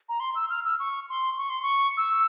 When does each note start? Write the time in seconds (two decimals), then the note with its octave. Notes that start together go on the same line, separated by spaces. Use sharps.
0.09 A#5
0.20 C6
0.35 E6
0.50 F6
0.65 E6
0.79 C#6
1.09 C6
1.38 C#6
1.50 C6
1.63 C#6
1.97 E6